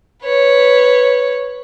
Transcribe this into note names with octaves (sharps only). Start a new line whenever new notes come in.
B4 C#5